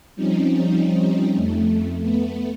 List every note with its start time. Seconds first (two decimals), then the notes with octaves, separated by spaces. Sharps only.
0.15 F3 G3 C4 C#4 D#4
1.33 F2 A3
1.99 A3 B3